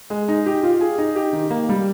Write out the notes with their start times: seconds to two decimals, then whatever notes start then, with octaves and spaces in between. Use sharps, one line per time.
0.10 G#3
0.28 D#4
0.46 G4
0.63 F4
0.81 G#4
0.98 D#4
1.16 G4
1.33 D#3
1.50 A#3
1.69 G3